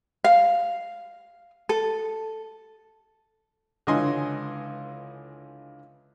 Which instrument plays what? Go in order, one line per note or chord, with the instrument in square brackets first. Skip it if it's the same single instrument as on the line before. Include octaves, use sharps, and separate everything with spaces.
[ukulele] F5
A4
[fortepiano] C#2 D3 E3 D#5 G#5 C6